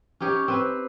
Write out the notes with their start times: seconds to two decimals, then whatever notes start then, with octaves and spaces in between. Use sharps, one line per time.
0.20 C#4 D#4 G4 C#5
0.48 C4 B4